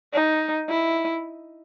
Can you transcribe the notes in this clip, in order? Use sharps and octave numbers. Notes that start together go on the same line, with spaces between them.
D#4
E4